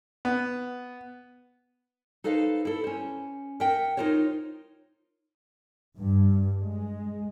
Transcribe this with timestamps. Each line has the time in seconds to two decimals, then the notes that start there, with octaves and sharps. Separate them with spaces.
0.25 B3
2.24 D#4 A4 B4 C5 F5
2.65 E4 A4
2.84 C#4 C5
3.60 A#4 E5 F#5 G5
3.97 D#4 F4 A#4 C5 C#5
5.97 G2
6.62 G#3